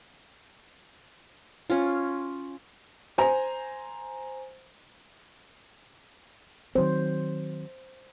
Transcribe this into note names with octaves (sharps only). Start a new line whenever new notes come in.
C#4 F4
C5 G#5 A#5
D#3 F#3 C4 C5